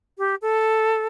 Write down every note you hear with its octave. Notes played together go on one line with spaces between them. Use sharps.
G4
A4